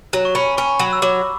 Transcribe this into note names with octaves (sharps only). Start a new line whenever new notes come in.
F#3 A#5
C#6
C#4 B5
C#4 C#6
F#3 B5
E6
F#3 D6